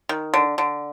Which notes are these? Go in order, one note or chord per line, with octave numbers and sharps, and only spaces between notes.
D#3
D3
D3